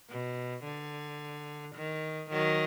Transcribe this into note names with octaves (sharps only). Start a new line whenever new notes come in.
B2
D3
D#3
D#3 F#3